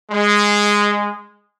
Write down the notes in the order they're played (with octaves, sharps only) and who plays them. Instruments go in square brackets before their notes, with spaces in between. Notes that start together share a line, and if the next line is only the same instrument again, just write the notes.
[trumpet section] G#3